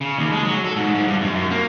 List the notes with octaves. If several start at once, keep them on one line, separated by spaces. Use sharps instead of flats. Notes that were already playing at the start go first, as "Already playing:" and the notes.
C#3
D#2
G#3
F#3
A4
G#2
G#2
G2
F#2
F#2
A#3